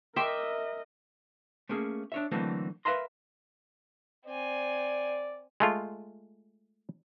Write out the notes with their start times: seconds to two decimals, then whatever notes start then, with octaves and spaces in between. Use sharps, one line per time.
0.16 A#4 D#5 E5 G5 C6 D6
1.69 A3 A#3 C#4 G#4
2.12 D4 C#5 E5
2.32 D3 E3 F#3 A3 A#3 C4
2.85 A#4 B4 E5 F5 A#5 C6
4.27 C4 D5 G#5
5.60 G#3 A3 F4